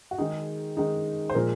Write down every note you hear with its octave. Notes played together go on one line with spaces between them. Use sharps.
F#4
D#3 G#3 D#4 G#4
D#3 G#3 D#4
C5
A#2 F3 G#3 A#4